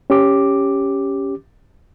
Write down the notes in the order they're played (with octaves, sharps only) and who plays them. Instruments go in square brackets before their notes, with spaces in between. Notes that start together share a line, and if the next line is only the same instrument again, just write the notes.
[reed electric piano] C#4 G4 D6